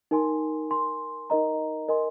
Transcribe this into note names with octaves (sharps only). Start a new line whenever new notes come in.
D#4 A#4 G#5 C6
A#4 G#5 C6
D#4 A#4 D#5 A#5
A#4 D#5 G#5 C6